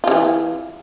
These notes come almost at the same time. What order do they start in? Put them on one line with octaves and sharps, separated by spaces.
F4 C#3 E3